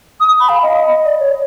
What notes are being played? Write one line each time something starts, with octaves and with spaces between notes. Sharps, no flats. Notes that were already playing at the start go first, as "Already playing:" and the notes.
D#6
B5
F5
D#5
D5
C#5